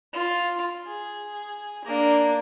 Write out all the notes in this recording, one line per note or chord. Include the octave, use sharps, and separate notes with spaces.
F4
G#4
A#3 D4